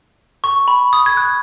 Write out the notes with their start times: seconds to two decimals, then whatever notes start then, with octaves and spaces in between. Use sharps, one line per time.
0.44 C#6
0.68 B5
0.93 D#6
1.06 G#6
1.17 F#6